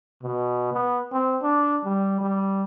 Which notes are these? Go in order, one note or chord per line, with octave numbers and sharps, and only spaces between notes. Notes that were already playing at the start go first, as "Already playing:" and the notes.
B2
B3
C4
D4
G3
G3